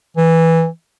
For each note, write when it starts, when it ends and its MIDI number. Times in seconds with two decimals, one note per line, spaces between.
0.17 0.67 52